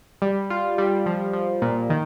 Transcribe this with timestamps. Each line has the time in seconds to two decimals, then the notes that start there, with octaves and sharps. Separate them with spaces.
0.22 G3
0.50 F4
0.78 G3
1.06 F3
1.33 F3
1.62 A#2
1.90 D#3